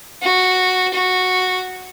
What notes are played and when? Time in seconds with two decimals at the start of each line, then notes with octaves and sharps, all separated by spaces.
0.22 F#4
0.94 F#4